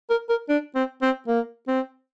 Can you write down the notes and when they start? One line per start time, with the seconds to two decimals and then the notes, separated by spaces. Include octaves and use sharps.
0.10 A#4
0.29 A#4
0.49 D4
0.75 C4
1.02 C4
1.28 A#3
1.68 C4